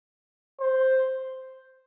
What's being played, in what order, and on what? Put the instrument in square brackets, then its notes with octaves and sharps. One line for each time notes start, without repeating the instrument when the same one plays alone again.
[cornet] C5